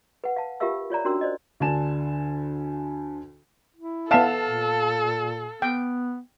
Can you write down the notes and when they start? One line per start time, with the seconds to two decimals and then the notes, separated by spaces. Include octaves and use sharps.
0.24 B4 F#5
0.36 F5 A5
0.60 F4 G4 A#4 E5 F5 E6
0.90 F4 C#5 D5 A#5
1.05 C#4 D4 F#4 A#4 C6 E6
1.21 C5 D5 D#5
1.60 D2 D3 G#5 A5 E7
3.76 E4
4.11 B3 A4 E5 F5 A5 E7
4.44 A#2
5.62 B3 G5